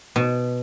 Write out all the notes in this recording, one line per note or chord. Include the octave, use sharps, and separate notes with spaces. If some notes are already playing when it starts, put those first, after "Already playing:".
B2